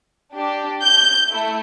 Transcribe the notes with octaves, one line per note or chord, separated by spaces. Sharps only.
D4 G4
G6
A3 E4